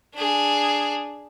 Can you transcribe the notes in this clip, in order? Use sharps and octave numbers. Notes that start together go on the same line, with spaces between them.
D4 G#4